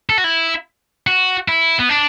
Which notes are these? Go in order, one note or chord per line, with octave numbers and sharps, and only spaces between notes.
A4
F#4
E4
F#4
E4
B3
D4